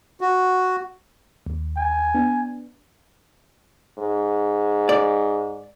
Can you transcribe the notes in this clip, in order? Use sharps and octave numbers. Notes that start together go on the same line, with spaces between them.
F#4
D#2
G#5
B3 D4
G#2
D5